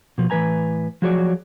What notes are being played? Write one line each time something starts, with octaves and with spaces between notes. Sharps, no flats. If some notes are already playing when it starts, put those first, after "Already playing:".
B2 F3
A2 E3 G3 B4 G#5 A#5
F3 F#3 F#4 G#4 C#5 D5